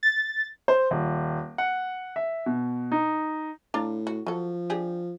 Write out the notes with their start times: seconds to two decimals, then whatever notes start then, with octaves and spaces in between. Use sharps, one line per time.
0.03 A6
0.68 C5
0.91 D#1
1.58 F#5
2.16 E5
2.46 B2
2.92 D#4
3.74 A2 D4 F4 A#5
4.07 F#4
4.26 F3 F#3 A4
4.70 D4 G4 G#4